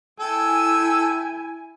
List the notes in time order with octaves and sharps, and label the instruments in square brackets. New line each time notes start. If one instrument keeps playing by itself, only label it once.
[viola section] E4 G#5 [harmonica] A4 G5 E6